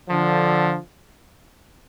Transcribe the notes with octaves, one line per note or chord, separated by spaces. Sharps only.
D3 F3